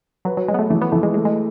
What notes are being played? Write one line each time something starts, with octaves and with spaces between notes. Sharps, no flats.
F#3 B4
F#3
F#3 G#3
B3
A3
E3 A3
B3
E3 A3
G#3
G#3 A3
G#3